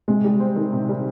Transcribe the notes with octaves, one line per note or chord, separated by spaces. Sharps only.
C3 G#3
G3
C4
D#3
C3
G3